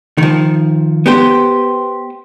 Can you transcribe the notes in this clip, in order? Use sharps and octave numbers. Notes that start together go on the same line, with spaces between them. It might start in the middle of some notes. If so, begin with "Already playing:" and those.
D#3 F3
B3 G4 C5